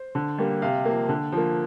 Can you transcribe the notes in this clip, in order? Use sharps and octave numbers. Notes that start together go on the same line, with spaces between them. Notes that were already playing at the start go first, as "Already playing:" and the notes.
Already playing: C5
D3
G3 A#3
C3 F5
F3 A#3
D3
F3 A#3